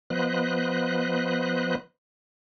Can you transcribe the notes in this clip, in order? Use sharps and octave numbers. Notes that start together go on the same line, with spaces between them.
F3 B3 B4 C5 D#5 F#6